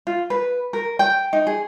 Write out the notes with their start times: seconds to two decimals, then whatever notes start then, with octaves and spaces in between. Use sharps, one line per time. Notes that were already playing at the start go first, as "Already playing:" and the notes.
0.07 F4
0.30 B4
0.73 A#4
0.99 G5
1.33 D#4
1.47 G#4